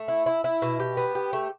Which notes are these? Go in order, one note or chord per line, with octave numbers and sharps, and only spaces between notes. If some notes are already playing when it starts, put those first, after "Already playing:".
Already playing: A3
E4
E4
E4
B2
G4
B3
G4
A3